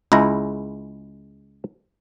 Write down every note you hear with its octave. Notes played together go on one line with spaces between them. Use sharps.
C#2 G#3 E4 A#5